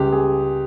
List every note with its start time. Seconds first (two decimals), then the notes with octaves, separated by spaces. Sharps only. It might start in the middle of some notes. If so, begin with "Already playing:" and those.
Already playing: C#2 G3 G4
0.12 G#4